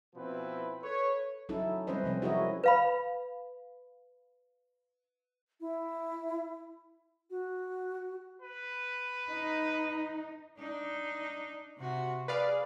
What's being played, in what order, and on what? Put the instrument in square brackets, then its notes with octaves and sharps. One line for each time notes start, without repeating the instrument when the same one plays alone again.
[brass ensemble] B2 F3 C4 E4 B4
A4 B4 C#5
[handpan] F#3 C#4 D#4 E4 A4
G3 C4 C#4 B4 C5 D#5
C3 F3 C4 C#4
E4 F#4 G#4 A#4 C#5 D#5
[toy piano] B4 F5 B5
[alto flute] E4
F#4
[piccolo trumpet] B4
[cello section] D#4
[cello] D4 D#4
C3 F#4
[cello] G#4 [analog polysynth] B4 D5 F5